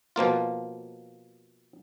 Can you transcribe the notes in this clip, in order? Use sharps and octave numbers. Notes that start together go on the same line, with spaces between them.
B2 F3 A#3 F4